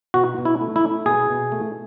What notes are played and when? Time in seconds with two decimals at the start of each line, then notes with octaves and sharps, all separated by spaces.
0.14 B2 F#4
0.38 B2
0.45 E4
0.61 A3
0.76 E4
0.83 A3
1.06 B2 G#4
1.30 B2
1.52 A3